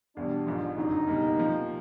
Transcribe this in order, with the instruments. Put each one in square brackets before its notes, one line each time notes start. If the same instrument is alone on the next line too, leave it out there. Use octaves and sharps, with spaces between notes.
[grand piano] E2 B2 G3 [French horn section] D4
[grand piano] A1 G#2 F3
[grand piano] F#1 F2 D3 F#3 [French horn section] D#4
[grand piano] C#2 B2 G3 A#3
C3 F3 A#3